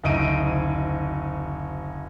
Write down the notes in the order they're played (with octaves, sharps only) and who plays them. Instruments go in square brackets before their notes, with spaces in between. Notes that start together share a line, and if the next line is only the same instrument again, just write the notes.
[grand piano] F#1 D2 D#4 D7 D#7